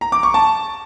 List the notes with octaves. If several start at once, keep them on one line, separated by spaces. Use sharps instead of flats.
A#5
D6
C#6
A5